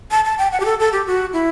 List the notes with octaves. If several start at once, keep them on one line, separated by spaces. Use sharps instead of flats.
A5
A5
G5
F#5
G4
A4
A4
G4
F#4
E4